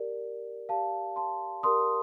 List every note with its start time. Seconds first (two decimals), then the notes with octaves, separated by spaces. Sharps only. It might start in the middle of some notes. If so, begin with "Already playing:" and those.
Already playing: G4 A#4 D5
0.69 G4 A#4 D5 F5 A5
1.16 A5 C6
1.63 G4 A#4 D5 C6 D#6